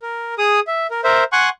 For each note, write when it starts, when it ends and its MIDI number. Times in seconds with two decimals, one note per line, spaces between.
0.02 0.34 70
0.38 0.60 68
0.38 0.60 87
0.67 0.87 76
0.90 1.01 70
1.04 1.24 70
1.04 1.24 72
1.04 1.24 76
1.32 1.49 78
1.32 1.49 80
1.32 1.49 84
1.32 1.49 85
1.32 1.49 90